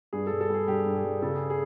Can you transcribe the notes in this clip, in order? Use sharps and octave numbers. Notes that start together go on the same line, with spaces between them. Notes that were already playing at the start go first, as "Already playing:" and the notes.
G2 G#4
A4
G2
A4
G3 G#4
G2 G4
G2
G#4
G2
C#3 A4
G#4
G#4